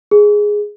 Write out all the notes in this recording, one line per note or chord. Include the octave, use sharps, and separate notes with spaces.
G#4